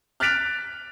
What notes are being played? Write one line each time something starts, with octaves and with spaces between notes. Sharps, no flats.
F6 F#6 A6 B6 D7 F7